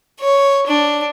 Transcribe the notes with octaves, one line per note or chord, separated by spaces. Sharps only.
C#5
D4